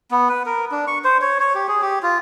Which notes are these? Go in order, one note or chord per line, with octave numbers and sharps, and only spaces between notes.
B3
B4
A#4
D4
C#6
C5
C#5
C#5
G4
G#4
G4
F4